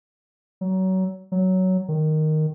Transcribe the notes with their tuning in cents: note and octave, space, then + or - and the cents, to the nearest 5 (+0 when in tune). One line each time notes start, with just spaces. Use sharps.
F#3 +25
F#3 +10
D#3 -5